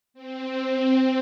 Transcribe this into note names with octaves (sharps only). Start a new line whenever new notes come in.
C4